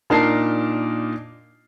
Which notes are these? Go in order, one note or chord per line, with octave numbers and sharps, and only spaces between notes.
A#2 D4 D#4 A#4 A5 C7